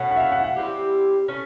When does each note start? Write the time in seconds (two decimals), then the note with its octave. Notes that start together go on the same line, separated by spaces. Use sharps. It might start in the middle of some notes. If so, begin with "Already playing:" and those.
Already playing: B2 A3 C#4 F#5
0.11 F#5
0.16 E5
0.20 F5
0.32 F#5
0.44 F#5
0.56 G3 C4 E4 G4
1.28 A3 C#4